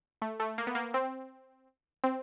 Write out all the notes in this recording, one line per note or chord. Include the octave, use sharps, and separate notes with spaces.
A3
A3
A#3
B3
A#3
C4
C4